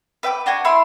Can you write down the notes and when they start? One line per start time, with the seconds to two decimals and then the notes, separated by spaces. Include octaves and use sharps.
0.23 B4 E5 G5 D6
0.46 D4 F#4 G5 G#5
0.65 E4 B5 C6 E6